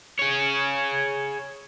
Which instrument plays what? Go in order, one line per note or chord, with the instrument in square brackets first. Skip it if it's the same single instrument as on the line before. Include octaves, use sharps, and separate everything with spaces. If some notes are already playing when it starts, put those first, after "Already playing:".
[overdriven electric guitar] G#4 C#5